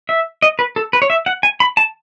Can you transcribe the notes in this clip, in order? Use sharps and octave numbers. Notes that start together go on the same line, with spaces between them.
E5
D#5
B4
A4
B4
C#5
E5
F#5
G#5
B5
A5